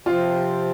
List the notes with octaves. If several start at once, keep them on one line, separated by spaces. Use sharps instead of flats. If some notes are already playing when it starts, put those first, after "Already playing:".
C3 F3 C4 F4